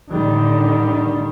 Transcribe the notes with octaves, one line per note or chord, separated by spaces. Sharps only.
A2 D3 D#3 G3